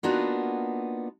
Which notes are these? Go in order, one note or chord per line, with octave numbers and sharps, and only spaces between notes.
A#3 B3 D4 D#4 F4 F#4